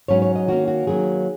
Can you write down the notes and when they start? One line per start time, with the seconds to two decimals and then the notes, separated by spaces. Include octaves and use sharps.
0.08 G#2 F#3 C#4 C#5
0.22 C#5
0.36 D#5
0.48 D#3 A#3 C#4 F#4
0.68 F#4
0.87 D#3 F#3 A#3 G#4